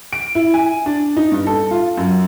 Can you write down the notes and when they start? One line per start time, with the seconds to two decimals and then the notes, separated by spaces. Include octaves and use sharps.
0.13 D7
0.35 E4
0.54 G#5
0.86 D4
1.17 D#4
1.32 G2
1.47 A4
1.71 F4
1.98 F#2